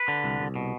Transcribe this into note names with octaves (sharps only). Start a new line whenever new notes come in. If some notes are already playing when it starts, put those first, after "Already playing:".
Already playing: B4
D3
C2
C2
B2